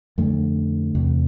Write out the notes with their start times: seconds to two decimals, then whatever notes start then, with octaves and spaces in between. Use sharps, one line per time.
0.18 F2 D3 A3
0.95 E2 C3